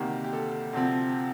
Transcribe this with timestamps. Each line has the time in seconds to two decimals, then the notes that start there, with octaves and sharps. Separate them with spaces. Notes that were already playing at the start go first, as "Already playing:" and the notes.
Already playing: D2 C3 D#3 A#3 G4
0.24 G4
0.33 A4
0.73 D2 C3 F3 C4